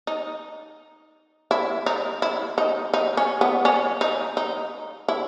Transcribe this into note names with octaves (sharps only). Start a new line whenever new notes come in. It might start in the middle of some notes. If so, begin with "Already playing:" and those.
D#4
E4
D#4
E4
D#4
D#4
C#4
B3
C#4
D#4
D#4
E4